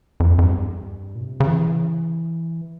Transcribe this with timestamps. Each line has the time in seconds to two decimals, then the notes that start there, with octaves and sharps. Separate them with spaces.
0.20 F2
0.38 F2
0.45 G2
1.15 A#2
1.21 C3
1.40 C#3
1.47 E3